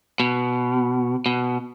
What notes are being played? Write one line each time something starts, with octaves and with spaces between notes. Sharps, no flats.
B2
B2